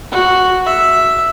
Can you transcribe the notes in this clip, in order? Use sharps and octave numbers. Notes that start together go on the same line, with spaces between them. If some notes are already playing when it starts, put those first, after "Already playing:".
F#4
E5